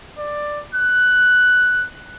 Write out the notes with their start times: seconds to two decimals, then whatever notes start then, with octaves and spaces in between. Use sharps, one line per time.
0.18 D5
0.75 F#6